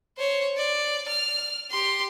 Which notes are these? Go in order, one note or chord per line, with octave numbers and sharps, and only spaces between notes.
C5 C#5
D5
F6
G4 C6